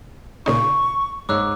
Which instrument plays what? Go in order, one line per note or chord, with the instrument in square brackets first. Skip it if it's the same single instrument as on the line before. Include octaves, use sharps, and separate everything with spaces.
[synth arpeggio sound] A#2 C#3 D#4 [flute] C#6
[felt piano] G#2 C#5 [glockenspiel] D6 E6 F#6